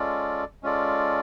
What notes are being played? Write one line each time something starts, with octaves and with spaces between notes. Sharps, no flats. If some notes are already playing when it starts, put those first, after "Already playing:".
Already playing: G#3 C#4 F4 A4 D5
G#3 C#4 F4 A4 D5